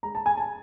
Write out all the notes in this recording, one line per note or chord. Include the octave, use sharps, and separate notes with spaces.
G#3 A#5
A5
G#5
A5